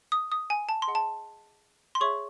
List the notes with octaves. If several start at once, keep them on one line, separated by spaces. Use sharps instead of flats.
D#6
D#6
G#5
A5
C6
G#4 D#5 F#5
A5
C6
G#4 C#5 E5 C#6